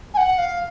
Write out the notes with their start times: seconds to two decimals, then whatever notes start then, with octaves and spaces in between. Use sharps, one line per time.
0.14 G#5
0.17 F#5
0.38 F5